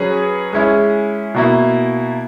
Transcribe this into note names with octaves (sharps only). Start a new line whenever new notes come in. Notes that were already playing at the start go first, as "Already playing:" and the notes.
Already playing: F#3 C#4 G#4 B4
G#3 C#4 E4
B2 A#3 E4